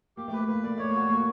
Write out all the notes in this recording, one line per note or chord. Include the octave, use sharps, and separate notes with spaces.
A#3 G4
A3
B4
A3
A#3 B4
A#3 D5
A3 C#5
A#3
F#4
A#3 F#4